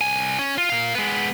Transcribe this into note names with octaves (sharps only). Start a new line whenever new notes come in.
C2 G#5
C#4
F4
A#2 F5
G#3 B3